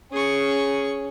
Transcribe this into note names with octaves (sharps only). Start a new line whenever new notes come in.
C#4 G#4 C#6